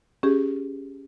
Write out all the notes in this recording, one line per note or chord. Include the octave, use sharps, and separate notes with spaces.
C#4 G4 G#4